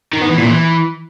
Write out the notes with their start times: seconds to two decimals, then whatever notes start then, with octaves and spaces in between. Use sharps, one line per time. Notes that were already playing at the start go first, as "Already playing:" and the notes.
0.13 D#3
0.21 B3
0.29 E3
0.38 A#2
0.46 E3